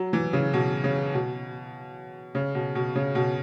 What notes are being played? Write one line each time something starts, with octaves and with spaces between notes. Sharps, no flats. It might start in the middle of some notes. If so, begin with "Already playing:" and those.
Already playing: F#3
E3
C#3
B2
C#3
B2
C#3
B2
B2
C#3
B2